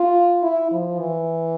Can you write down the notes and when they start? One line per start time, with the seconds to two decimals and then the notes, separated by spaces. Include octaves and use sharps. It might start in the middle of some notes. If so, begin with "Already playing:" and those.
Already playing: F4
0.43 E4
0.72 F3
1.00 E3